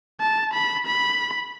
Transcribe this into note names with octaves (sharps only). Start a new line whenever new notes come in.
A5
B5
B5